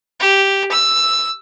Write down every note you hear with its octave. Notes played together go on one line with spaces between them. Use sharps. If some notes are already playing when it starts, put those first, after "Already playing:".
G4
E6